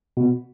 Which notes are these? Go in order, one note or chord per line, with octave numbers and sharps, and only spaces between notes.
B2